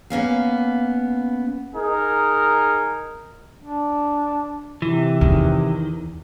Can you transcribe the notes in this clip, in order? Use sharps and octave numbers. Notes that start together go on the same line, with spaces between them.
A#3 B3 C#4 F5
D#4 G#4 A#4
D4
C3 E3
E2 D#3